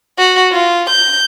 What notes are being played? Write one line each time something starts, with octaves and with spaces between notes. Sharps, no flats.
F#4
F4
G6